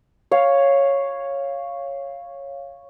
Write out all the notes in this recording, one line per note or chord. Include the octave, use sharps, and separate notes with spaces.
C#5 F5